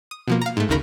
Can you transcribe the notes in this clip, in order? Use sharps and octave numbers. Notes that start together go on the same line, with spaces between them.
D#6
B2 F3 A#3
F5 A#5
G#2 A3
G#1 D2 C#3 D#4 A#4 B5